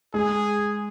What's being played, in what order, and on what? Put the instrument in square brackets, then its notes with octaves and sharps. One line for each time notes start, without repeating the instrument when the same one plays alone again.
[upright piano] G#3 [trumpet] G#4